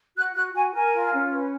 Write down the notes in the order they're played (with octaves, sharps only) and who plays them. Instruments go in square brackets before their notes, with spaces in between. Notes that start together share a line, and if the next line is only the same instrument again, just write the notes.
[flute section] F#4 F#6
F#4 F#6
F#4 G#5
A#4 G#5
F4
C#4
B4